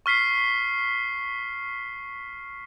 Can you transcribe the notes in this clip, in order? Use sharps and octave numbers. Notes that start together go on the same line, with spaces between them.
C#6 F6 B6 C7